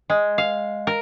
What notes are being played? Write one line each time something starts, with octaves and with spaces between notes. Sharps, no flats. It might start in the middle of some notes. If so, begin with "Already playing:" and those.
G#3
F5
A#4